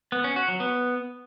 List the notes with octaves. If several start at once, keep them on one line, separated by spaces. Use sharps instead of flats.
B3
C#4
F#4
F#3
B3